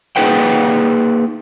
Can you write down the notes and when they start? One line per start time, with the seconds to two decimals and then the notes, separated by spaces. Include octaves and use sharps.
0.16 A#3 D#4 G#4 B4 F#5 G5